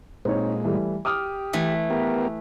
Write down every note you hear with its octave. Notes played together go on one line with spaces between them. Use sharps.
A#2 G#3 C4 D#4 C#5
E3 G3 A3
G4 D6 D#6 F6
E3 A3
B3 G4 A#4